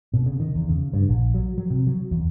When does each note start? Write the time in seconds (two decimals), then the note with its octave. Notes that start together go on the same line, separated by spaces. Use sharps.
0.13 B2
0.26 C#3
0.40 D#3
0.55 E2
0.69 C#3
0.93 G2
1.09 A#1
1.34 F#3
1.58 F#3
1.70 C3
1.87 F#3
2.11 E2